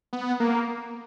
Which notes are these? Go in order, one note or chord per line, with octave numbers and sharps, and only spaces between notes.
B3
A#3